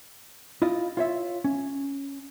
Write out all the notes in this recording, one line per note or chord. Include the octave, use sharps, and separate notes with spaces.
E4 F4 D#5
F4 C#5 E5
C#4